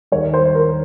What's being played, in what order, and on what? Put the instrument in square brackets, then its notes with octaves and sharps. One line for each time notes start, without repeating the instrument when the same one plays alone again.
[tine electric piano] D#2 D#3 G3 [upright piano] C#5
[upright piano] C5
A#4